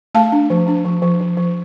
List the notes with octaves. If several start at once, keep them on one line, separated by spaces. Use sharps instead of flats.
A3 F5 A5
D4
F3
D4
F3
F3
F3
F3